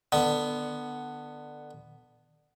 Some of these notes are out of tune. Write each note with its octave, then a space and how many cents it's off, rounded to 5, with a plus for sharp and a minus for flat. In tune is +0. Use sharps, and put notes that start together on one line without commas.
D3 +20 B3 +0